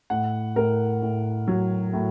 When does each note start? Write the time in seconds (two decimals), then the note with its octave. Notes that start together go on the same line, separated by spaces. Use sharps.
0.10 A2 F#5
0.56 A2 A#4
1.02 A2
1.48 F#3
1.94 A2